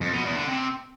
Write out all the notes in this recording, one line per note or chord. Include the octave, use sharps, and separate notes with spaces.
F2
B2
E2
D3
C3